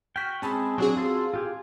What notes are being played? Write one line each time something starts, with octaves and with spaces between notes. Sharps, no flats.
F#4 G5 F6 B6
G#3 C4 C#4 G#4 A5 B5
F#3 C4 D4 F#4 G#4
F4 A4 C6
F4 G4 G#4